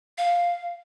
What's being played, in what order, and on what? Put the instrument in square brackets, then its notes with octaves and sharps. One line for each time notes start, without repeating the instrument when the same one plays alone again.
[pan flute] F5